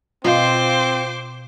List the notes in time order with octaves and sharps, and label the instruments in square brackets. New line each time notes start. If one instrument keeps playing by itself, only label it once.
[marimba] B2 D#5 F5 [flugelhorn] C4 [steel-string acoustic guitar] F4 [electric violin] C5 D6